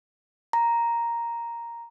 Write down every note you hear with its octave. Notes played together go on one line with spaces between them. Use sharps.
A#5